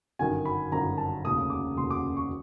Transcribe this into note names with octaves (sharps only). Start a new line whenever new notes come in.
G1 F#2 D#3 G#5
B5
G1 F#2 D#3 A#5
A5
F1 D#2 C#3 D#6
D6
F1 D#2 C#3 C6
D6
C#6